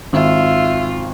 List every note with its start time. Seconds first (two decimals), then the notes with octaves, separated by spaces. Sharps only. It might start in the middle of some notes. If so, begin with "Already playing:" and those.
0.13 G#1 F4 E5